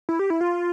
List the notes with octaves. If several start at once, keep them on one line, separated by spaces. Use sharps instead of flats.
E4
G4
E4
F4